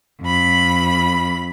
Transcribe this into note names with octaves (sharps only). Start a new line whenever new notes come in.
F2 B5